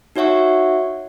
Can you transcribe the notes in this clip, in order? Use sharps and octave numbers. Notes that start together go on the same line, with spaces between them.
D#4 F#4 C#5 E5 F#5 C#6